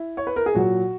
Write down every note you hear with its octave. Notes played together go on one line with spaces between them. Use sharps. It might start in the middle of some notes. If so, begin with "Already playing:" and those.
Already playing: E4
C#5
B4
A#4
G#4
A#2 F#3 F#4